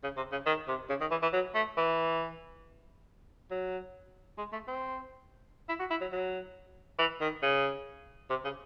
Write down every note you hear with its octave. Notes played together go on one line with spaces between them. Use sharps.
C#3
C3
C#3
D#3
C3
C#3
D#3
E3
E3
F#3
A3
E3
F#3
G#3
A3
C4
E4
F#4
E4
F#3
F#3
E3
D#3
C#3
C3
C#3